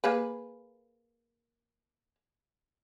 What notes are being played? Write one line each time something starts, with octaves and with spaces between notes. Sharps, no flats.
A#3 G#4 B4